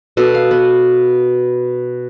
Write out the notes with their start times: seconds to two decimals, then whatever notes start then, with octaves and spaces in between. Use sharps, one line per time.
0.17 B2 A4
0.34 F5
0.51 B3